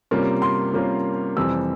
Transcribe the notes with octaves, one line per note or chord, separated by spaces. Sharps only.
C3 G3 A#3 C#4 F4
C6
C3 G3 A#3 C#4 F4
F2 C3 E3 G3 C4 E6